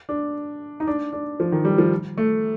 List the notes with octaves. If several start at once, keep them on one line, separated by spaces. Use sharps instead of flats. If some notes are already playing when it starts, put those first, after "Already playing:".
D4
D#4
D4
D4
F3
D#3
G3
F3
A3